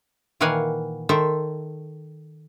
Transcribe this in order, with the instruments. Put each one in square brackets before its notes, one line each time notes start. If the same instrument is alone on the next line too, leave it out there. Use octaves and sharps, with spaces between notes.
[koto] A#2 D#3 E3 F5 F#5 G#5
D#3 A4 C5 E5